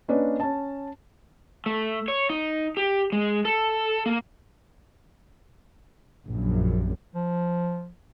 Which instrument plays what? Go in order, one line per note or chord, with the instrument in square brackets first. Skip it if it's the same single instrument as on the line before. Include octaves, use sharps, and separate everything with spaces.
[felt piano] A#3 C#4 D4 B4 D5 D#5
C#4 A5
[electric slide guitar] A3
C#5
D#4
G4
G#3
A4
A#3
[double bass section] A#1 F#2
[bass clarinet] F3